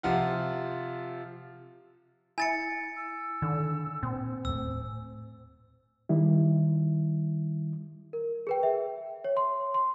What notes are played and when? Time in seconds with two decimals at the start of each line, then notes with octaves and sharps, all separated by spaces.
0.03 C3 F3 F4 F#5
2.38 E4 G#5 A6 C#7
2.96 E6
3.42 D3 D#3
4.03 A#2 C4 C5
4.45 D#1 A2 E6
6.09 D#3 G3 E4
8.13 A#4
8.47 G#4 B4 G5
8.63 E5
9.24 C#5
9.37 C6
9.74 C6